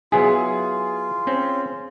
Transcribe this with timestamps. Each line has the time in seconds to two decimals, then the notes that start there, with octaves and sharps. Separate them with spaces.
0.12 F#3 B3 E4 F4 G#4
1.27 C4 C#4